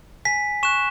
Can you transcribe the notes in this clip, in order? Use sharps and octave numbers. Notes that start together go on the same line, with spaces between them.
G#5 B6
C#6 F#6 E7